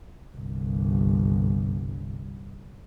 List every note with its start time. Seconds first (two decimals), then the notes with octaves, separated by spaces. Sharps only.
0.36 G1 C2